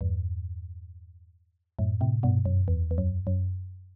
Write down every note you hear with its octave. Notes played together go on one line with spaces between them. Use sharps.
E2 G2
F#2 A2
A2 C3
G2 B2
F#2
E2
E2
F#2
F#2